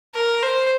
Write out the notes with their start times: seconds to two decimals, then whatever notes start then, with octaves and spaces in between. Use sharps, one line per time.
0.14 A#4
0.43 C5